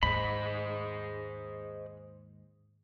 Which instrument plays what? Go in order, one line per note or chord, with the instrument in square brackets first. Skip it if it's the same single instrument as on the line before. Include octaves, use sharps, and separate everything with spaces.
[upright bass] D#2 G#2 [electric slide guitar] G#4 C5 D#5 [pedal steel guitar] B5